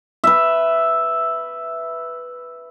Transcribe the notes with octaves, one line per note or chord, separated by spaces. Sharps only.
B4 E5